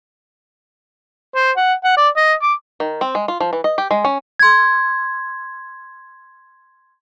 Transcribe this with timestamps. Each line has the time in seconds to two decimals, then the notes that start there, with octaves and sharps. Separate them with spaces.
1.35 C5
1.57 F#5
1.84 F#5
1.97 D5
2.16 D#5
2.42 D6
2.80 D#3
3.01 C4
3.15 G#3
3.28 F4
3.40 F3
3.53 E3
3.64 D#5
3.78 G4
3.91 G#3
4.05 C#4
4.39 C6 G#6